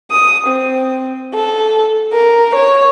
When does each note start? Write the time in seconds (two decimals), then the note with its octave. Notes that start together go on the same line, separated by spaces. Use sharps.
0.11 D#6
0.47 C4
1.34 A4
2.13 A#4
2.55 C#5